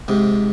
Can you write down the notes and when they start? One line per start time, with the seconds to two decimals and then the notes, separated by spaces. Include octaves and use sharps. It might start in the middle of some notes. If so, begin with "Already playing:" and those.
0.08 G#2 C3